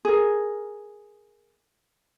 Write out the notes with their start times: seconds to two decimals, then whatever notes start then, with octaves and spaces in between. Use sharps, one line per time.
0.05 G#4 A#4